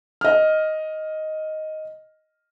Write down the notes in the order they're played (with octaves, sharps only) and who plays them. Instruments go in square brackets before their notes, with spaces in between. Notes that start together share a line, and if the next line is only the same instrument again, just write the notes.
[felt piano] D#5 F6